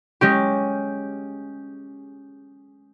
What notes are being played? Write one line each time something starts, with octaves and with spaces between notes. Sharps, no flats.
G#3 C#4 G4